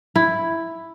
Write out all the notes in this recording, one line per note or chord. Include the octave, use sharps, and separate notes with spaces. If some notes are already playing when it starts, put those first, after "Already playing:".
E4